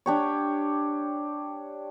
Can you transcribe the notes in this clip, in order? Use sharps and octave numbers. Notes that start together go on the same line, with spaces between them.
D4 G4 C#5